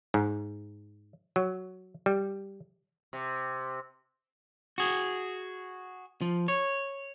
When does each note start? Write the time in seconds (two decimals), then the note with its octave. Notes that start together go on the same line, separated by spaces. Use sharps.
0.14 G#2
1.36 F#3
2.06 G3
3.13 C3
4.78 F#4 G#4
6.21 F3
6.48 C#5